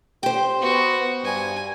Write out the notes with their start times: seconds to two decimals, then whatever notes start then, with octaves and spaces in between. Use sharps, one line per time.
0.23 G4 C5 G5
0.62 B3 F#4
1.24 G2 G#5